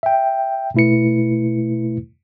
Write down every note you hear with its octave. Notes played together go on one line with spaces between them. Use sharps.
E5 G5
B2 A3 E4 B4 C#7